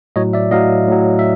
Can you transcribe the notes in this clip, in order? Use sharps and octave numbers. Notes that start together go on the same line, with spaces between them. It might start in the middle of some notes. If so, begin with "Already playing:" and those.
A2 F#3 C#5 D#5
D5 E5
A2 F#3 D#5 F5
A2 F#3
E5